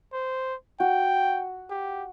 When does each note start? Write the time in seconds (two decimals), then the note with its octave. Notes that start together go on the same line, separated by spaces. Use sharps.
0.13 C5
0.80 F#4 G5
1.70 G4